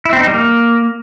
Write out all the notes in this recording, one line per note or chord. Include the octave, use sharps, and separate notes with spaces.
E4
C4
D#4
G3
A#3